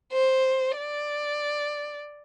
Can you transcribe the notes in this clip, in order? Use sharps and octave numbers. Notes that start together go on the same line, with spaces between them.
C5
D5